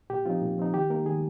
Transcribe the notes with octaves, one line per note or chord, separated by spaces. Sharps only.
A#2 G4
F3 C4 D#4 F4
A#2
F3 C4 D#4
D#3 G4
A#3 D#4 A#4
D#3 G#4